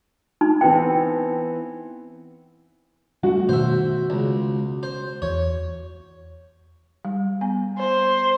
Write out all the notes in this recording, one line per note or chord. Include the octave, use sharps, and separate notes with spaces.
D#4
E3 B3 C4 G5
G3 A3 F#4
B2 D#3 A3 C5 E5
C#2
C5
E2 C#5
G3
B3 G#5
C5